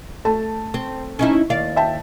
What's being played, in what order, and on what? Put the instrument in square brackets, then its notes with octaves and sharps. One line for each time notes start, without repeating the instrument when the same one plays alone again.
[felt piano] A3 A5
[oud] C4
C#4 D#4 E4
D#2 D5 F5
[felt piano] E5 G5 A5